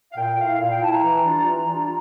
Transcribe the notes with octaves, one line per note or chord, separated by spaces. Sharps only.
F5
A#2 G5
A3 E4 F5
A#2 F5
G5
A3 E4 A5
A#5
E3
G3 D4 F4
E3
G3 D4 F4